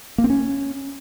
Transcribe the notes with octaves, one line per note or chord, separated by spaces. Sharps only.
A#3
C4
C#4